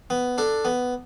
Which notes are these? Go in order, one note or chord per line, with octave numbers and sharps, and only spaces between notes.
B3
D4 A4
B3